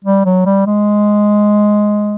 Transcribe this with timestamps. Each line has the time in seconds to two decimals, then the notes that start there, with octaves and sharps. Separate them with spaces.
0.04 G3
0.25 F#3
0.46 G3
0.67 G#3